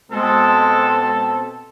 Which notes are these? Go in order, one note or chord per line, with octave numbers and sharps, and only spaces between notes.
B2 G#3 C4 A4